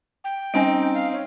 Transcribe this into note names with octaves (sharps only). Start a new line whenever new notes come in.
G5
G3 C4 C#4 D#4 G#5 D7
F5
C#4